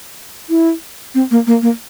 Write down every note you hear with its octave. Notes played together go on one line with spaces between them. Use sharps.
E4
C4
A#3
A#3
A#3